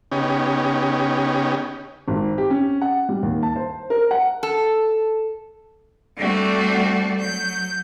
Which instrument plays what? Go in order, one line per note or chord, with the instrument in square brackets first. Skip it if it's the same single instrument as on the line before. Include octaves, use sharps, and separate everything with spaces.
[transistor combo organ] C#3 B3 C#4 D#4 G4
[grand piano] G#1
G4
C#4
F#5
G3
D#2
A5
C5
A#4
F#5
[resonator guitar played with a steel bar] A4
[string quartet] G3 A3 C4 D4 F#4 A4
F#3 G6